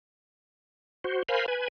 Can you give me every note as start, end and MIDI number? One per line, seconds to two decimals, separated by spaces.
1.04 1.23 66
1.04 1.23 72
1.29 1.46 70
1.29 1.46 72
1.29 1.46 77
1.29 1.46 80
1.29 1.46 83
1.48 1.68 71
1.48 1.68 80